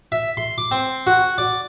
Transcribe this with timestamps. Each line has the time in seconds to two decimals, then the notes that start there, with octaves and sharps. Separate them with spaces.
0.12 E5
0.37 C6
0.58 D6
0.71 C4
1.07 F#4
1.38 D5